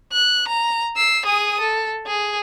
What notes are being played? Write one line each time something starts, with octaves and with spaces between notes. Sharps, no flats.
F#6
A#5
E6 C7
G#4 D#6
A4
G#4